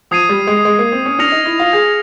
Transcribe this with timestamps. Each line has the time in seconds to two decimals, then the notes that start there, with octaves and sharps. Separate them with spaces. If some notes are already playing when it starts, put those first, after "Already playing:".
0.11 F3 D#6 G#6 C7 D#7
0.29 G3
0.47 G#3
0.65 G#3
0.79 A#3
0.92 C4
1.05 C#4
1.19 D4 F6 A#6 C#7 F7
1.32 D#4
1.46 E4
1.59 F4
1.73 G#4